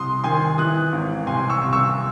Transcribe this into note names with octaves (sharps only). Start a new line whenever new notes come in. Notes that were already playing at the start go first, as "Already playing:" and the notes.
Already playing: C2 C6 D#6
D#3 G#5 C6
E3 D#6 F#6
G#1
C2 G#5 C6
C#6 E6
C2
C#6 E6